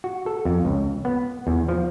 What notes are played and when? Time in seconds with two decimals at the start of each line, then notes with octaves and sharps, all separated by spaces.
0.04 F#4
0.26 A4
0.45 F2
0.65 C#2
1.05 B3
1.47 E2
1.68 F3